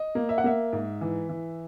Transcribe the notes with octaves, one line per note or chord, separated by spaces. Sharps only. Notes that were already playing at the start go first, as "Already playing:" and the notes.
Already playing: D#5
A#3
E5
F#5
A#3 E5
G#2
E3
E3